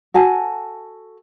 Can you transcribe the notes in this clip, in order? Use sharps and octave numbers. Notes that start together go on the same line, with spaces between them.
F#4 A4 G#5 A5